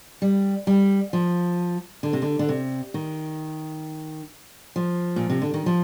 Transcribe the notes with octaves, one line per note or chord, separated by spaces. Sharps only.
G3
G3
F3
D3
C3
D3
D3
C3
D#3
F3
A#2
C3
D3
D#3
F3